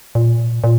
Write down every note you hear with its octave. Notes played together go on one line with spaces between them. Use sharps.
A#2
A#2